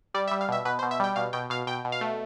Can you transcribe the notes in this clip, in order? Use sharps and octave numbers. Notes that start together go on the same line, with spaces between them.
G3 D5
E5
G3
F5
B2 E5
B2 B4
C5
B2
E5
G3 G5
B2 F5
B2 G5
B2 F5
B2 G5
B2
F5
A3